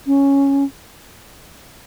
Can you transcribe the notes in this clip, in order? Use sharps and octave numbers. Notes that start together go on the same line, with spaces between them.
C#4